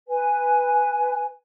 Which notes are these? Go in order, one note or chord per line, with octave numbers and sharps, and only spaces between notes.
B4 G#5